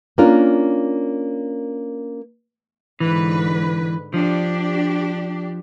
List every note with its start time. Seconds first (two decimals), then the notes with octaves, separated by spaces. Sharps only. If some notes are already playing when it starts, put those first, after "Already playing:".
0.18 A#3 C#4 D4 F4 A#4
3.00 G#2 D3 E3 B4
4.14 F3 D4 G4